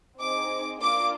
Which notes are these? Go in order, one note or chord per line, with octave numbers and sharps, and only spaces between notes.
C4 D#4 G#4 D6
A#3 D4 F4 D6